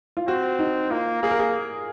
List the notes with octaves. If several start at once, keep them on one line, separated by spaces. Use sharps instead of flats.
F4
C4 F#4
D#4
A#3 F4
A#3 G#4
A#4
G#4